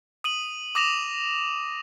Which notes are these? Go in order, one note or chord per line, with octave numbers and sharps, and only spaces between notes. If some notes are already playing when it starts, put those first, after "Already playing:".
D#6 D#7 F#7
D6 D#6 A#6 E7 F7